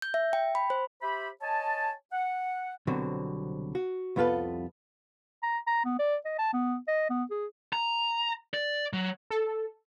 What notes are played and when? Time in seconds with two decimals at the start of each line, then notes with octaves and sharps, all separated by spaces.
0.02 G6
0.14 E5
0.33 G5
0.55 B5
0.70 C5
1.02 G4 C5 E5 B5
1.42 C#5 D#5 G#5 A5
2.12 F#5
2.87 C2 B2 D3 F#3 C4
3.75 F#4
4.16 C2 F2 B3 F4 A4 B4
5.43 A#5
5.67 A#5
5.85 B3
5.99 D5
6.25 D#5
6.39 A5
6.53 B3
6.87 D#5
7.09 B3
7.30 G#4
7.73 A#5
8.54 D5
8.93 F#3
9.30 A4